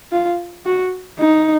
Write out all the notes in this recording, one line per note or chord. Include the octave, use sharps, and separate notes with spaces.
F4
F#4
D#4